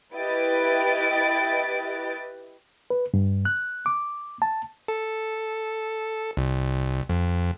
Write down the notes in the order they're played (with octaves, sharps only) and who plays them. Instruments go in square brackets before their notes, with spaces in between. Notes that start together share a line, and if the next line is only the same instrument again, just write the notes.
[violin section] E4 G4 B4 D#5 A6 D7
[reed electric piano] B4
G2
F#6
D6
A5
[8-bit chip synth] A4
C2
F2